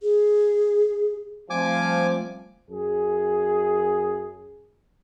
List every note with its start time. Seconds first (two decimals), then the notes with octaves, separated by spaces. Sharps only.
0.02 G#4
1.50 F3 G3 A3 C4 G#5 D6
2.69 F#2 G#4